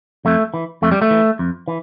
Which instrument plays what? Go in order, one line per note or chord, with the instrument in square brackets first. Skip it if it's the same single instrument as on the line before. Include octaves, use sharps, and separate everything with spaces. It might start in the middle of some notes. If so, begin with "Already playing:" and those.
[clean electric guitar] F2 A3
E3
F2 A3
G3
A3
E3
F2
E3